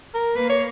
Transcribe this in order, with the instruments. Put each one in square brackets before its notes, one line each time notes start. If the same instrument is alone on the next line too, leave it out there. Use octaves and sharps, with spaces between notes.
[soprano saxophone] A#4
[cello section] A#3 [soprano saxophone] B4
[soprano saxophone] C#5